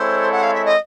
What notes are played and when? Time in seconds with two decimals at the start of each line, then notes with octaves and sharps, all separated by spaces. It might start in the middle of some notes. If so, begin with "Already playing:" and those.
Already playing: G#3 C4 E4 A4 C5 C#5
0.31 F#5
0.43 F5
0.53 E5
0.65 D#5